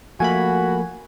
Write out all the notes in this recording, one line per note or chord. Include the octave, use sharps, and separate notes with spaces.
F3 A3 A#3 F#4 G#5 B5